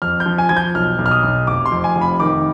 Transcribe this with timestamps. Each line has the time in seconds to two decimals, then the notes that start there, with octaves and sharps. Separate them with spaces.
0.02 F2 F6
0.20 G6
0.26 F3
0.38 G#5
0.49 F3 G#6
0.57 G6
0.75 B1 F6
0.99 B1
1.06 F6
1.11 D#6
1.23 B1
1.47 F1 D6
1.66 C6
1.72 F2
1.84 G#5
1.96 F1
2.01 B5
2.20 D#3 D6